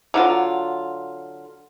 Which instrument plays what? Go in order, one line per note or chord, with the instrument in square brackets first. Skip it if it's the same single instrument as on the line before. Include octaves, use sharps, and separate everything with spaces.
[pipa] D3 F#3 F4